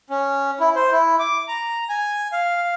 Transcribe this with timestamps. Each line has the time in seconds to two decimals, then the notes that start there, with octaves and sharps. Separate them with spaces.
0.10 C#4
0.60 E4
0.75 C5
0.91 E4
1.19 D6
1.48 A#5
1.89 G#5
2.32 F5